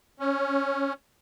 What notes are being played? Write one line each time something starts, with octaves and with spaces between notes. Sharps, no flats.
C#4